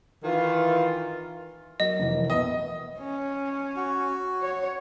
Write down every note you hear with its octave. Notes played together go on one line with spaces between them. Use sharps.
D#3 E3 F4
F#3 A#4 D#5
F1 E3 A#4
B2 B4 D#5 E5
C#4
F#4
C#5